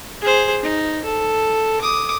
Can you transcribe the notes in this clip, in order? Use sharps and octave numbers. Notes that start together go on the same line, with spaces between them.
G#4 C5
D#4
A4
D6 D#6